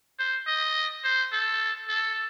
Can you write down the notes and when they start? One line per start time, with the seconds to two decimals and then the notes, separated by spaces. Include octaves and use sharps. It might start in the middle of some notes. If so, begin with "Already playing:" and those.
0.19 C5
0.47 D#5
1.04 C5
1.33 A4
1.88 A4